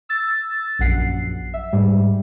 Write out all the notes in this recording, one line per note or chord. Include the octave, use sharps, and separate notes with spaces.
E6 A6
A#1 F#2 F#5 C7
E5
G#2 G3